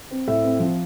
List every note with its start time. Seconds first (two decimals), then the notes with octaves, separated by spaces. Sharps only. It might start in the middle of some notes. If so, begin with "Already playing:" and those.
0.11 C4
0.27 A2 E5
0.44 C4
0.60 F3